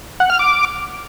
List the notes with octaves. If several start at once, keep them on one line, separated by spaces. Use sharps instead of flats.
F#5
F6
D6